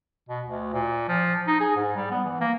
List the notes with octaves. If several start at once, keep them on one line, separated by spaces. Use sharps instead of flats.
B2
D2
A#2
F3
D#4
G#4
G#2
G3
B3
E3
A#3